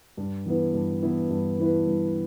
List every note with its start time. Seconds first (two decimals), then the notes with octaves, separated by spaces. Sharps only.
0.17 G2
0.46 E3 B3 E4 B4
0.74 G2
1.02 E3 B3 E4 B4
1.30 G2
1.59 E3 B3 E4 B4
1.87 G2